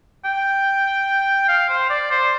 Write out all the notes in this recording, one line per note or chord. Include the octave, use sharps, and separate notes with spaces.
G5
F5
C5
D5
C5